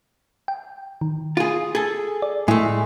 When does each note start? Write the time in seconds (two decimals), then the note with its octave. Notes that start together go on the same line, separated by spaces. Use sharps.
0.48 G5
1.01 D#3
1.37 F4 G#4
1.75 G#4 A4
2.22 D5
2.48 A2 G#3 A3 E4